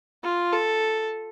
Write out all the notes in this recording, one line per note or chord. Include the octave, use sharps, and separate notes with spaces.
F4
A4